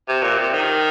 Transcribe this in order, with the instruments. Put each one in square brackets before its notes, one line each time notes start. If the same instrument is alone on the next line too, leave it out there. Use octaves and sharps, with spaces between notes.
[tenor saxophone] C3
A#2
C3
D#3